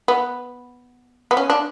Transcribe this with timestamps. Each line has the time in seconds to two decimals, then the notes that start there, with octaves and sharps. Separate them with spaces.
0.08 B3
1.31 B3
1.37 C#4
1.50 D4